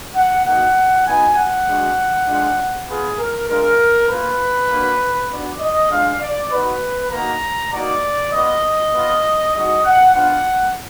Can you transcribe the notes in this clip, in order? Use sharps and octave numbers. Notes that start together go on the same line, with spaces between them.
F#5
A#3 D#4 F#4 F#5
B3 D#4 F#4 G#5
F#5
G#3 D4 F#4
G#3 D4 F4
B3 F4 G#4
A#4
G#3 D4 F4 A#4
A#3 F4 B4
A#3 D4 F#4
B3 D4 F#4 D5
D#5
G#3 D4 F4 F5
D5
B3 D#4 F#4 B4
A#3 D#4 F#4 A#5
A#3 D#4 F#4 D5
B3 F4 D#5
B3 F4
G#3 D#4 F#4 D#5
F#5
B3 D4 F4 F#5